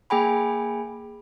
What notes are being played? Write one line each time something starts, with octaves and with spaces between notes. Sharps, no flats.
A#3 G#4 G5 G#5 B5